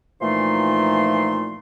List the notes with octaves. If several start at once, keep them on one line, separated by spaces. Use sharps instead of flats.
A#2 E3 F3 A3 D#4 C6